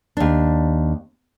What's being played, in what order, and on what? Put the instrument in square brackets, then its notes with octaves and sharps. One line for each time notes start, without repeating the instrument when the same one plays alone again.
[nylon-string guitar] D#2 D4